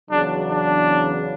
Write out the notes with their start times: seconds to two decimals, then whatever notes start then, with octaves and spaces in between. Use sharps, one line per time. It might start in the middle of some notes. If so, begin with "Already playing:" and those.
0.10 E2 C#3 F#3 D4
0.50 D4